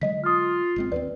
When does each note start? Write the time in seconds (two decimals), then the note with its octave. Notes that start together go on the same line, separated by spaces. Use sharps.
0.01 D3 F#3 G#3 D#5 B6
0.24 F4 D#6 F6
0.76 G#1 G#3 C4
0.92 D#2 A3 C4 B4 D5